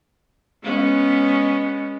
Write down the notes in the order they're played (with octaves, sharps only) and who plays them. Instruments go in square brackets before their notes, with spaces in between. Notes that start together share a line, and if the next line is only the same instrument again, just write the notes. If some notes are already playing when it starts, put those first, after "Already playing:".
[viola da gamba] G#3 B3 C#4